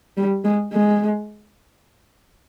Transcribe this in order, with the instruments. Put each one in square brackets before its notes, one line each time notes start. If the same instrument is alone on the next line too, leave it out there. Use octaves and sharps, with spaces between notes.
[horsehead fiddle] G3
G#3
G#3